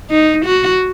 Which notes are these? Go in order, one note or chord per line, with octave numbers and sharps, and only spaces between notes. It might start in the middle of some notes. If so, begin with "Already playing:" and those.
D#4
F#4